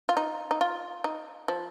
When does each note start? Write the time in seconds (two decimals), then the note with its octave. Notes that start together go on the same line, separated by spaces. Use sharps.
0.09 F4
0.17 D#4
0.51 D#4
0.61 F4
1.04 D#4
1.48 F3